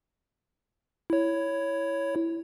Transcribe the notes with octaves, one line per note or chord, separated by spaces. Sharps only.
E4 C#5